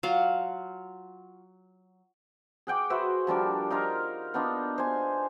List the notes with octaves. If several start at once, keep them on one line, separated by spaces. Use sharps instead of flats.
F#3 F4 F5 F#5
G#4 F#5 G5 D6
F#4 B4 C5 E5
F3 G3 D4 A#4
D#4 F4 A#4 F5
B3 D4 D#4 F4
C5 G#5